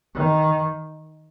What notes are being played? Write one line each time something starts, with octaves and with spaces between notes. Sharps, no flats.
D#3